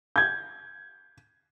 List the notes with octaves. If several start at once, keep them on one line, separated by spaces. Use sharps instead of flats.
G6 G#6